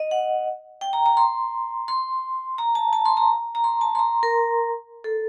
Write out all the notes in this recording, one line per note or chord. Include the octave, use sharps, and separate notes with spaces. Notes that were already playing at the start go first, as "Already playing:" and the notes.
Already playing: D#5
F#5
G5
A#5
A#5
C6
C6
A#5
A5
A5
C6
A#5
A#5
C6
A5
C6
A#5
A#4
A4